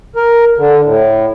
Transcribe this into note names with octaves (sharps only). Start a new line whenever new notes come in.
A#4
D3
A2